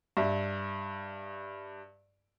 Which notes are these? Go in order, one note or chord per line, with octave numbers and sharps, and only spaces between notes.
G2 E5